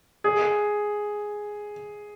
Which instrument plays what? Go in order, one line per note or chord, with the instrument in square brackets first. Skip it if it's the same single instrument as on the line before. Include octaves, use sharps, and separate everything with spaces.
[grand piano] G#4